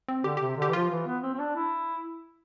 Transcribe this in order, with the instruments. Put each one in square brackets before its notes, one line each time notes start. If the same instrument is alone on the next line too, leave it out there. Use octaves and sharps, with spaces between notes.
[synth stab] C4
[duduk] D3 [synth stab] G4
[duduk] C3 [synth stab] G4
[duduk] D3 [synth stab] G4
[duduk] E3
[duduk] F3 [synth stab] F4
[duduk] E3
B3
C4
C4
D4
E4